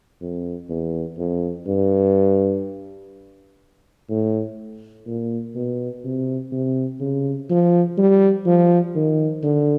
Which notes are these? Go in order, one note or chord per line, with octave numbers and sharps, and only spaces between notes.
F2
E2
F2
G2
A2
A#2
B2
C3
C3
C#3
F3
G3
F3
D#3
D3